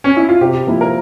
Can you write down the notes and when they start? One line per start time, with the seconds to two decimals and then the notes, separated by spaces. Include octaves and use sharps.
0.04 C#4
0.17 E4
0.29 F4
0.41 C3 G4
0.67 F3 A#3 E4
0.81 A#4